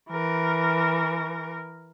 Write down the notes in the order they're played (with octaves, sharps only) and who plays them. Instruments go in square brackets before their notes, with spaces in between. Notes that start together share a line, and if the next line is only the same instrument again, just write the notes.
[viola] E3 A#4